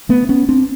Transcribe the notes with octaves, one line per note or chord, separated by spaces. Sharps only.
A3 B3
B3 C#4
C4 D4